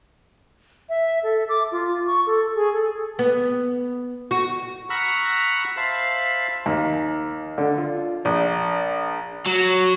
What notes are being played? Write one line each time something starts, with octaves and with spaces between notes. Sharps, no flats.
E5
A4
D6
F4
C#6
A4
G#4
A4
B3
F#4
F#5 A#5 B5 C#6 E6 F6
C5 E5 F5 A5 B5
D#2
D3
F4
A#1
F#3